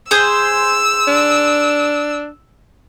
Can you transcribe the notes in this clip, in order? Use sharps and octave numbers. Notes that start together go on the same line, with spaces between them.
G#4 C5 E6
D4